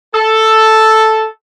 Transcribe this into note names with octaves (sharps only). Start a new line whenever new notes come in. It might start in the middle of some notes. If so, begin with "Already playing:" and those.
A4